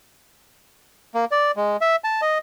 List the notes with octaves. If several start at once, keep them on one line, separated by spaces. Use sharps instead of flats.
A#3
D5
G#3
E5
A5
D#5